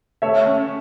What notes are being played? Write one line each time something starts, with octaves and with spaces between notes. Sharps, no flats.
A3 C#5 E5
C#4